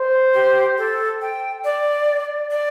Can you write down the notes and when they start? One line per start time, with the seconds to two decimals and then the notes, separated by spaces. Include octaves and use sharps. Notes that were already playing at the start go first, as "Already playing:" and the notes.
Already playing: C5
0.34 G4
0.78 A4
1.21 G5
1.64 D5
2.51 D5